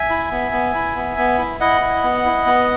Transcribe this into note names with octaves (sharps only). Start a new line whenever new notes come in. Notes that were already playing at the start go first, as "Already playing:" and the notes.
Already playing: E5 G#5
E4
B3
B3
E4
B3
B3
E4
E4 D#5 F#5
E4
B3
E4
B3